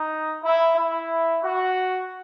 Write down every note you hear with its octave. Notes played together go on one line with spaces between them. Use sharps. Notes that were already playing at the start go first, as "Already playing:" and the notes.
Already playing: D#4
E4
E4
F#4